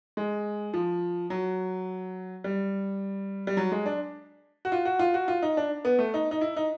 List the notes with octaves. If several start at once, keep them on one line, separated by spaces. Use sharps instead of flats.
G#3
F3
F#3
G3
G3
F#3
G#3
D4
F#4
F4
F#4
F4
F#4
F4
D#4
D4
B3
A3
D#4
D#4
E4
D#4